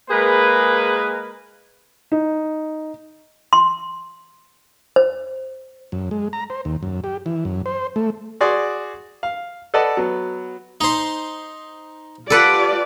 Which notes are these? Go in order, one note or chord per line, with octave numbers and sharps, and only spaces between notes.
G#3 A#3 G#4 A#4 B4
D#4
C6
C5
F#2
G#3
A#5
C5
D#2
F#2
G4
E3
F#2
C5
A3
F#4 G#4 D5 C6 D6
F5
A4 B4 D5 D#5 F#5 A5
F#3 B3
D#4 C5
F4 G4 A4 B4 D5 F#5